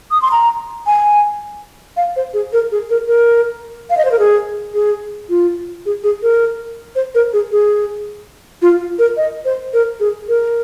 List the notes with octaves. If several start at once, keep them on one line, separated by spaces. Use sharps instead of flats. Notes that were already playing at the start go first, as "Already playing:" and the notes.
D#6
C6
A#5
G#5
F5
C5
G#4
A#4
G#4
A#4
A#4
F5
D#5
C5
A#4
G#4
G#4
F4
G#4
G#4
A#4
C5
A#4
G#4
G#4
F4
A#4
D#5
C5
A#4
G#4
A#4